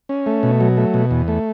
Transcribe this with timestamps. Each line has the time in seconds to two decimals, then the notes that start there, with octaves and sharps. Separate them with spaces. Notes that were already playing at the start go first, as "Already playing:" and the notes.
0.09 C#4
0.26 A3
0.43 B2
0.60 F#3
0.77 A3
0.94 B2
1.11 E2
1.28 A3